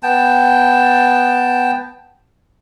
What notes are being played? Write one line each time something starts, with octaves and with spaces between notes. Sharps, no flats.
B3 G5 A5